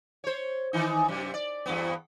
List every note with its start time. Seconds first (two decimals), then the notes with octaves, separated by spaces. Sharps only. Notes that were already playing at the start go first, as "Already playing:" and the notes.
0.24 C5 C#5
0.73 D#3 E3 D#4
1.08 F#2 C3
1.34 D5
1.66 E2 G2 B3